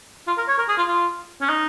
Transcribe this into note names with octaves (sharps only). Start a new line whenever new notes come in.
F4
A#4
C#5
A#4
G#4
F4
F4
C#4
D#4